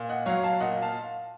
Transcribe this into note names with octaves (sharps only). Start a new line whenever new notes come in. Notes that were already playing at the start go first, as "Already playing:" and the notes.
Already playing: A#2
D#5 F#5
F#3 C#5 F5
F5 A5
A#2 D#5 F#5
F5 A5